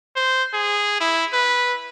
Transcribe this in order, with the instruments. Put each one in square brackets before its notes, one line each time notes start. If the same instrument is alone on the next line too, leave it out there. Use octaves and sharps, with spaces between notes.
[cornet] C5
G#4
E4
B4